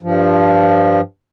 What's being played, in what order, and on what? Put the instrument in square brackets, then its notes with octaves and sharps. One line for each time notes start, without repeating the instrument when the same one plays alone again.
[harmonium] G2 F3